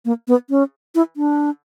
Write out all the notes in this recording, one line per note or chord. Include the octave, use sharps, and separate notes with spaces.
A#3
B3
C#4
E4
D4